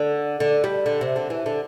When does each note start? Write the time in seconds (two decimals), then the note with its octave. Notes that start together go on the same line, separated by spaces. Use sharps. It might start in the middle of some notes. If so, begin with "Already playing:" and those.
Already playing: D3
0.40 D3
0.64 G3
0.86 D3
1.01 C3
1.16 D3
1.30 E3
1.46 D3